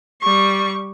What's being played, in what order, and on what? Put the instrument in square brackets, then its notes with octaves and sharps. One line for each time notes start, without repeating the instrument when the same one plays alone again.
[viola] G3 C#6